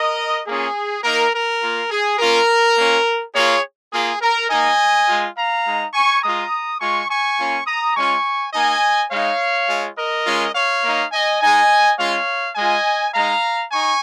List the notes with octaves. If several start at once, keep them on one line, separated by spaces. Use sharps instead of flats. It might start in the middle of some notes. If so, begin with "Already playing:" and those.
Already playing: A#4 D#5
A#3 C#4 F4 G#4
A#3 D#4 A#4
A#4
A#3 F4
G#4
A#3 C#4 F4 A#4
A#3 C#4 F4
A#3 F4 G#4 C#5
A#3 F4 G#4
A#4
A#3 D#4 D#5 G#5
G#3 F4
F5 A#5
G#3 D#4
G#5 C#6
G#3 F4 A#5 D#6
G#3 F4 G#5 C#6
G#5 C#6
A#3 C#4 F4
A#5 D#6
G#3 C#4 F4 G#5 C#6
A#3 D#4 D#5 G#5
G#3 D#4 C#5 F5
G#3 F4
A#4 D#5
G#3 C#4 F4
C#5 F5
A#3 D#4
D#5 G#5
G#3 D#4 D#5 G#5
G#3 C#4 F4 C#5 F5
G#3 D#5 G#5
F4
G#3 D#4 F5 A#5
D#4 G#5 C#6